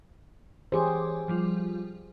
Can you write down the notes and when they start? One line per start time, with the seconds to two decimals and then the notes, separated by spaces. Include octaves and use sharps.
0.72 E3 G4 G#4 C5 C#5 D6
1.28 F3 G3 F4